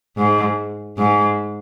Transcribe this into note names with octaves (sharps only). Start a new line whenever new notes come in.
G#2
G#2